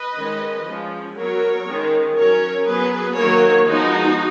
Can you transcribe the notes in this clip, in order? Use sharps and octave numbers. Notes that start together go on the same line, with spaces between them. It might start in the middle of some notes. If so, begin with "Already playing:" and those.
Already playing: B4 D#5
D#3 G#3 C#4
F3 G#3 C#4
F#3 B3 A#4 C#5
D#3 G#3 C#4
F#3 C#4 A#4 C#5
F#3 B3 G#4 B4
D#3 F#3 A#3 A#4 C#5
F3 G#3 B3 D#4 F#4